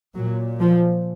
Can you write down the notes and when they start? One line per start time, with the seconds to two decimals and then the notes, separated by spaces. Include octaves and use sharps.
0.15 A#2 F#3
0.60 F3